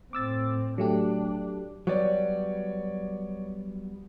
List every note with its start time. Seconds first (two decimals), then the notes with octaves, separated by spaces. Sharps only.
0.13 A2 C4 D6 E6 A6
0.78 F#3 A3 D4 G4
1.87 F#3 G3 B3 C#5 D5